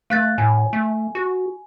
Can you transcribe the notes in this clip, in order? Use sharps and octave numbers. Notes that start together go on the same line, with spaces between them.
A3 F5 F#6 A6
A2 G#5
A3
F#4